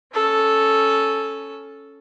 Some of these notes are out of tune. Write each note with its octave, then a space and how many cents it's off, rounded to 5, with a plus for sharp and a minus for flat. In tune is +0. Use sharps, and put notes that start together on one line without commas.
C#4 +0 A4 -5